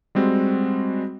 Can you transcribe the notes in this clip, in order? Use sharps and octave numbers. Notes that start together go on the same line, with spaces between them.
G3 G#3 C4 F#4